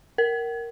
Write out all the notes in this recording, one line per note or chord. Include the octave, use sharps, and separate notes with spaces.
A#4